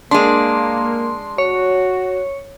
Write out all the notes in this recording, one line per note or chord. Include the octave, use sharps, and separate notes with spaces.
G#3 A#3 D4 C6
F#4 C#5